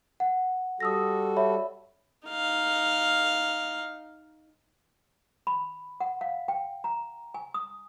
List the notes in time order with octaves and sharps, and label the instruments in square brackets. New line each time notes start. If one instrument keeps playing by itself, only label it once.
[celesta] F#5
[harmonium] G3 F#4 A4 [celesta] D#6 E6 A#6
[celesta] C#5 E5 B5
[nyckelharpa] D#4 F5
[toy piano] B5
F#5
F5
G5
A#5
G#5
D#6